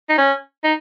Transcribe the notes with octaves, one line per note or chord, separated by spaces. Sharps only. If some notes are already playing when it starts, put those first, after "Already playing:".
D#4
C#4
D#4